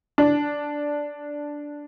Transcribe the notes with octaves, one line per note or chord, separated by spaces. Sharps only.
D4